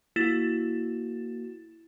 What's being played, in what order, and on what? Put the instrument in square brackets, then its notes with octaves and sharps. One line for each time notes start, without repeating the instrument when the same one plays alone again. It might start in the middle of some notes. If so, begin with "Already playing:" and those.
[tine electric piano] A#3 F#4 [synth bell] E4 A6 E7